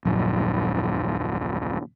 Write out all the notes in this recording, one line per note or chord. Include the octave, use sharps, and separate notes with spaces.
D#1 A#1 F#2